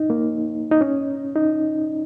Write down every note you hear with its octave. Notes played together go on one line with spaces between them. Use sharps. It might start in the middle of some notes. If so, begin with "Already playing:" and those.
Already playing: D#4
A#3
D#4
C#4
D#4